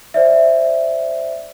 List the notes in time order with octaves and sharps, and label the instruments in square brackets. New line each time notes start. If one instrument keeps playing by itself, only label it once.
[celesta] C5 D5 E5